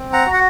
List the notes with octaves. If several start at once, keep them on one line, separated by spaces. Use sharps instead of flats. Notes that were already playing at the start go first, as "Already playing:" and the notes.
Already playing: C4
F#5 A#5
F#4
F#5